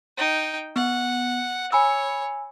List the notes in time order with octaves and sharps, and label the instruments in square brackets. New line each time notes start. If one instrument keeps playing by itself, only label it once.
[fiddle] D#4 G5
[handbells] B3 [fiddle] F#5
[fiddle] C#5 [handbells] G#5 B5 E6